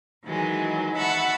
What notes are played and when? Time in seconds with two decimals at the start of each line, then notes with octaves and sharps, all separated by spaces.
0.25 D#3 E3 F#3 G#3
0.95 E5 F#5 A5 B5 C#6